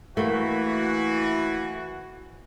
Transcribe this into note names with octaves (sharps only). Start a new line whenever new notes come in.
E3 A3 A#3 F#4